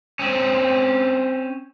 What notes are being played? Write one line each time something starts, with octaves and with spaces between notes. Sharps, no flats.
C4 C#4